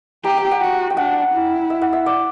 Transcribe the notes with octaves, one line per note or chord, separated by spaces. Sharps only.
G4 A#5
G5
F#5
F#4 G5
G5
D4 F#5
E4
E5
F#5
E5
D5